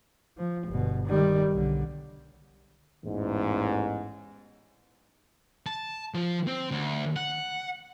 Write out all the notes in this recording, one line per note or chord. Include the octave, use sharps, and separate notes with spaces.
F3
G1 B2
D#3 G3
B1 D3
A1 E2 G#2
A5
F3
C4
D2
F#5